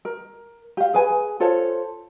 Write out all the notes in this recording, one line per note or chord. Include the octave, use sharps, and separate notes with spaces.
A#4
G4 F5
G#4 B4 G#5
F4 A4 C5 C#5